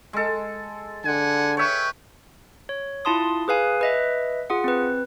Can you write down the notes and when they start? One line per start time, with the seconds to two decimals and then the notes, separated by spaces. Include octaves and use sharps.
0.13 G#3 A4
1.04 D3 F#5 G#5
1.57 B4 C#5 E5 G5
2.69 C#5
3.05 E4 F4 A5 C6 D#6
3.48 G#4 B4 F5 G#5
3.81 B4 D#5 E5
4.50 F4 G#4 F#5
4.64 C4 B4